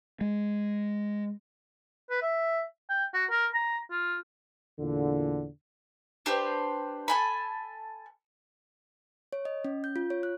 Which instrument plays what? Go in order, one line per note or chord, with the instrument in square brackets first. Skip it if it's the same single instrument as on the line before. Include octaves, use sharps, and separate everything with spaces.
[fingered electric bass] G#3
[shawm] B4
E5
G5
F#4
A#4
A#5
F4
[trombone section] E2 A#2 D3
[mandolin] D4 G4 B4 C5
A4 G#5 B5
[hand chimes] C#5
D#5
C#4
G6
F4
C#5
F#6